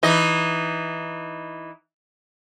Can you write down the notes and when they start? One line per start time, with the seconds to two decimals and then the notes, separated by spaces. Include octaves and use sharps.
0.03 E3 D#4 D#5